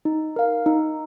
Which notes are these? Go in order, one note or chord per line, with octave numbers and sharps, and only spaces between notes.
D#4
A#4 F5
D#4